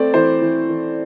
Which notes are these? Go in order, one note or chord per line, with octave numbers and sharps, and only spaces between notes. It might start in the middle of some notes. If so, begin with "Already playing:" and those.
Already playing: A3 C4 D5
E3 C5
E3
E3